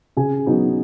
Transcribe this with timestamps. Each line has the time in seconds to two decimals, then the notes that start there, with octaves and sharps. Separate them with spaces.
0.17 C#3 G#4 G#5
0.46 F#3 B3 D#4